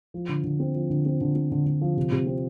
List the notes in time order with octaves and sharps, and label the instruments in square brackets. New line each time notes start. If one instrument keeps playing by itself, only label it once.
[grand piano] F3
D3
D3
C4
F3
D3
C4
D3
C4
D3
D3
F3
C3
C3
C4